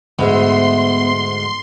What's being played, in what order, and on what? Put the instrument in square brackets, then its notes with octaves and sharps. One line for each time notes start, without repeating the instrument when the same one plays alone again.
[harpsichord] D2 G#2 [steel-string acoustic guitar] B3 E5 [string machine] C6